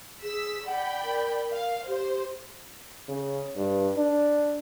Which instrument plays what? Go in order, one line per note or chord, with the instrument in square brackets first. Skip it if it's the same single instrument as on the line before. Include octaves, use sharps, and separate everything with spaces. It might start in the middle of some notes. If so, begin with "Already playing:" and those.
[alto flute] G#4 [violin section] E6 B6
[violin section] D5 G5 B5 [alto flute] F#5
[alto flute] A#4
[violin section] F5
[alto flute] G4 [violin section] C5
[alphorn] C#3
G2
D4